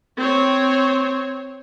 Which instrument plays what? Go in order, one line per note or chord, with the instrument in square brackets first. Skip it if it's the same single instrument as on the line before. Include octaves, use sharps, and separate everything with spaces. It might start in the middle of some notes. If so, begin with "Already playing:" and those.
[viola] C4 C#5